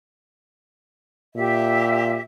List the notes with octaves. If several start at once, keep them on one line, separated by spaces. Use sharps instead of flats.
A#2 G4 E5